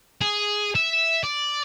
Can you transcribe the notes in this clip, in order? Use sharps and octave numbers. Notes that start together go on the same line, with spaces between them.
G#4
E5
D5